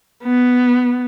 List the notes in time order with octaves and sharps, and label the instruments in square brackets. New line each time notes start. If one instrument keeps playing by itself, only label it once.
[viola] B3